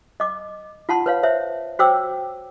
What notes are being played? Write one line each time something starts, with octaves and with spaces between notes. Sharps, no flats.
D#5 D6
F4 F#5 A5 C6
B4 C#5 F5
C5 C#5 E5
F#4 C5 C#5 G5 D6 E6